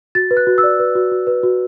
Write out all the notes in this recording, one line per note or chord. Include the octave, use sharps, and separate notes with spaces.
F#4 A6
B4
F#6
F#4
E6
D5
B4
F#4
F#4
B4
F#4